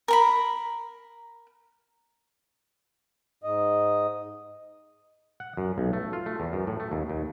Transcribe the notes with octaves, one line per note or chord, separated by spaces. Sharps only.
A#4 A#5 B5
G#2 D#5
F#5
F#2
B1
A3
F4
A3
E2
F#2
A2
A3
D#2
D#2